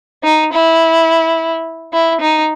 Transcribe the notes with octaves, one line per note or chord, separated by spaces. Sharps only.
D#4
E4
E4
D#4